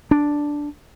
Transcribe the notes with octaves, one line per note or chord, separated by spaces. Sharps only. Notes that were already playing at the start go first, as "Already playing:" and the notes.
D4